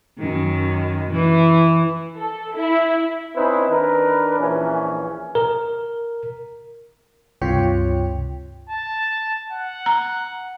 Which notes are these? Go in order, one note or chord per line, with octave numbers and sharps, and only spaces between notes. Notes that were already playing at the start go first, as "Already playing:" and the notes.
F#2 D#3
E3
A4
E4
C4 C#4 D#4 E4 B4 C5
D#3 D4 A#4 B4
A#1 E3 C#4
A#4
C#2 G2 C3 F4 C#5 G5
A5
F#5
A#5